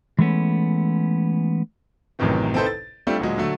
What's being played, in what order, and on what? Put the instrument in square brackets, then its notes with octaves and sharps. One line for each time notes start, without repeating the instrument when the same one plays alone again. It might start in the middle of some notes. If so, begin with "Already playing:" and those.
[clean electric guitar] E3 G#3 A3 B3 C#4
[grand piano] A1 F#2 A2 C3 D#3 E3
C4 D#4 E4 A4 B4 C5
A6
G3 A3 C4 D4 F4
D2 A#2 F#3 G#3
D3 F#3 A3